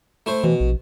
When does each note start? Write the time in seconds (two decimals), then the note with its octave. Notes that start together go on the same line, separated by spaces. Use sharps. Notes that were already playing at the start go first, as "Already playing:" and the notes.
0.26 A3 E4 C5
0.44 B2 E3
0.60 A#1